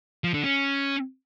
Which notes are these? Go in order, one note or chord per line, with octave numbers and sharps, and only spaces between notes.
F3
D3
C#4